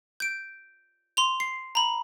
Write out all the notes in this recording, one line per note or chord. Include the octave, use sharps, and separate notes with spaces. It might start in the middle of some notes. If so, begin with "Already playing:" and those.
G6 D7
C6 F7
C7
A#5 B5